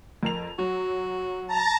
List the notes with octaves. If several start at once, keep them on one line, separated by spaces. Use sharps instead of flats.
F2 A#4 F7
F#3 F#4
A5 A#5